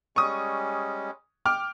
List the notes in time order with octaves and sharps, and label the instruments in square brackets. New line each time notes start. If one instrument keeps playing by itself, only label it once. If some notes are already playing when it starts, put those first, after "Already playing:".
[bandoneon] G3 G#3 C#4 [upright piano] C#6 D#6
[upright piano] G5 D6 F6